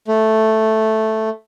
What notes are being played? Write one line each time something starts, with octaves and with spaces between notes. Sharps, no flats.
A3